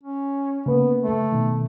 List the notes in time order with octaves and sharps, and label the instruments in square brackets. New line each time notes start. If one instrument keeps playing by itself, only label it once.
[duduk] C#4
[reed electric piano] C#3 A#3 B4 [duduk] B3
[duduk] A3
[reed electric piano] B2 D#3